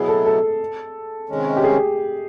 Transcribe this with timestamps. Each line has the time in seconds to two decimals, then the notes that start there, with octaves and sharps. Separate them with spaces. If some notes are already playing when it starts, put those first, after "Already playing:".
Already playing: B2 F#3 B3 E4 G#4
0.08 A4
0.26 A4
1.29 C3 D#3 G#3 C#4
1.57 G4
1.64 G#4